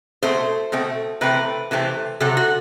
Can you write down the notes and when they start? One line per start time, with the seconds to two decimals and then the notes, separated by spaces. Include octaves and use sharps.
0.23 B2 A3 C4 C5
0.72 B2 A3 C4
1.21 C3 E3 A3 C4 B4
1.71 C3 E3 A3 C4
2.20 C3 F#3 C4 A4
2.37 F#4